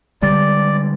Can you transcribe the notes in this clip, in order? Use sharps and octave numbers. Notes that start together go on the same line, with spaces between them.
D3 G3 G#3 D5